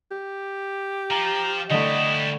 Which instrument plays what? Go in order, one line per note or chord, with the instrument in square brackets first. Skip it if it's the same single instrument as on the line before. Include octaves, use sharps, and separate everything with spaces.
[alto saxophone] G4
[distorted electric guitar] F3 [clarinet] A#5
[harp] D3 A3 [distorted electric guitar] G3 E4 [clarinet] D#5